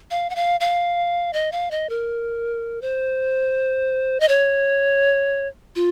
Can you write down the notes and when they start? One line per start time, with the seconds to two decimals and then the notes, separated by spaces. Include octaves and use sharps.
0.11 F5
0.30 F#5
0.36 F5
0.60 F5
1.33 D#5
1.52 F5
1.71 D#5
1.89 A#4
2.82 C5
4.20 D#5
4.29 C#5
5.76 F4